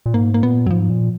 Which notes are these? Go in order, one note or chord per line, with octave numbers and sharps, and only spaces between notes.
A#2
G#2 A#3
A#3
A#2 B3
F#2 F#3
G#2 F3
A#2